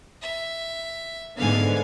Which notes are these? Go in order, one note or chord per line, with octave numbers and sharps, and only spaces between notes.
E5
G#2 D3 B3 F5 G#5